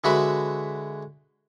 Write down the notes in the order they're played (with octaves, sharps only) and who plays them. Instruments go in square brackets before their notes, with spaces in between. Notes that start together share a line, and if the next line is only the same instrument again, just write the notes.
[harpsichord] D3 G#3 F#4 B4 E5 B5